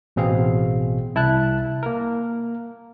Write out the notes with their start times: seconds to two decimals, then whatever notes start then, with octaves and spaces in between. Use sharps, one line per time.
0.16 A1 B2 C4 G#4 F5
1.15 C2 E4 A5 F#6
1.83 A#3 A#4